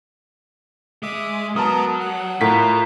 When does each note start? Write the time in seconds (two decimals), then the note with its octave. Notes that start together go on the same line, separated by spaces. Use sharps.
1.03 G#3 E5 D6 D#6
1.56 F#3 B3 A#4 A5 D#6
2.00 F#5
2.41 A2 F4 A#4 B6